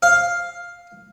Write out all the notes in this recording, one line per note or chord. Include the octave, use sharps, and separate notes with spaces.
F5